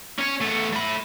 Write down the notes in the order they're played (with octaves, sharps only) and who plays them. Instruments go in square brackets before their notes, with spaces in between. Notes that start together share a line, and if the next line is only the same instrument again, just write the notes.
[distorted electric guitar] C#4 C#5
A3 B3
A3 B5